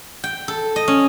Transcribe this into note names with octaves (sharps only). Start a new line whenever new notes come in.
G5
A4
D#5
C#4